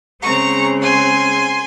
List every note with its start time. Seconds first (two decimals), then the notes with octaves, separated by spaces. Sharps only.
0.22 C#3 G#3 C4 A#5 C#6
0.82 G#5 C6